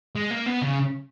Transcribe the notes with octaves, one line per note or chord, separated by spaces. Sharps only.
G#3
A#3
B3
C#3